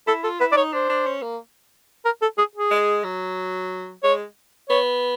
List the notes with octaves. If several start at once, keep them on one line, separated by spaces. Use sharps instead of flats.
E4 A4
F4 A4
E4 B4
D5
D#4 C#5
D4 C5
D4
C#4
A#3
A#4
A4
G#4
G#4
G#3
F#3
G#3 C#5
B3 C#5